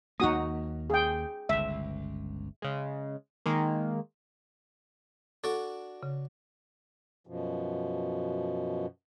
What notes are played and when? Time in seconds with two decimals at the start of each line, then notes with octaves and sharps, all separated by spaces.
0.20 D#2 A#3 D#4 F#4 D#6
0.90 G#4 G5
1.49 G1 C#2 E5
2.62 C#3 G#3
3.46 D#3 G#3 A#3
5.44 D4 F#4 A4 D5
6.03 C#3
7.27 F#2 B2 F3